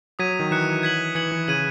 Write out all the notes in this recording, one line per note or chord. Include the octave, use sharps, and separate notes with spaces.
F#3 D#6 G#6 B6 D#7
D#3
E3 F#6 C#7 E7
G#6 B6 F#7
E3 G#6 C#7 F#7
E3
C#3 G#6 D#7 F#7